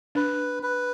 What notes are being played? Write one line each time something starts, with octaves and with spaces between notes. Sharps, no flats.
D4 B4
B4